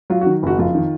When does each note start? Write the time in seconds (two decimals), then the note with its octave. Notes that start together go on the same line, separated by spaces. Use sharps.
0.10 F#3 F4
0.21 F#4
0.26 D#3
0.43 F#1 F#4
0.58 F2 F4
0.75 D#3